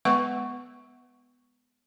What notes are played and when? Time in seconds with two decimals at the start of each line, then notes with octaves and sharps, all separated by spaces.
0.05 G#3 B3 B4 F#5 C#6